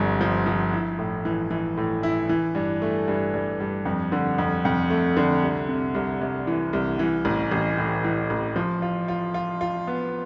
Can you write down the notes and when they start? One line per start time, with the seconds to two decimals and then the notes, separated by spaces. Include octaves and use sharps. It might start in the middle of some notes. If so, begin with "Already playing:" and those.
Already playing: G1 G2 F3 C4
0.21 F3
0.46 F3
0.73 E4
0.99 A2
1.25 E3
1.51 E3
1.77 A2
2.03 E4
2.29 E3
2.55 G2
2.82 A3
3.08 G2
3.34 G2
3.60 G2
3.85 F2
4.12 D3
4.38 F2
4.65 F2
4.90 A3
5.17 D3
5.43 C2
5.69 C3
5.94 C2
6.21 C2
6.47 E3
6.73 C2
6.99 E3
7.25 A1
7.51 A1
7.78 A2
8.04 E3
8.30 A1
8.56 F3
8.82 F4
9.08 F4
9.34 F4
9.61 F4
9.87 B3